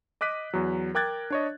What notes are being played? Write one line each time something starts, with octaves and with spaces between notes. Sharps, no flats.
D#5 D6 F#6 B6 D#7
E2 F#3
A#4 G5 D6 F#6 G#6 A6
D4 C#5 D#5